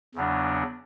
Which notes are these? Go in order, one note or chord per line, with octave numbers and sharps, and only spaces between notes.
E2 C#3 F#3 B3 D4